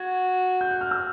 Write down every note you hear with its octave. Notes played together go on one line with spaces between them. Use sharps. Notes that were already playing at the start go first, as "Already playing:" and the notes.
Already playing: F#4 G#6
G6
F#6
F6
E6